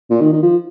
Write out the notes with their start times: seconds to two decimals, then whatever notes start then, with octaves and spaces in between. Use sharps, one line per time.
0.10 A#2
0.21 D#3
0.33 D#3
0.42 F3